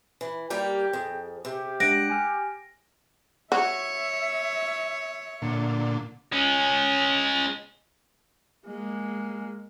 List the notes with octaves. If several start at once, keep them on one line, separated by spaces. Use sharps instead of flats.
E3
G3 A#3 G4 G5 G6
F2 G#4
C3 G4
G#3 D4 F#5 A#6 D7
G#5 F6
F#4 C#5 E5
A#2 D3
G#3 C#4
G#3 A#3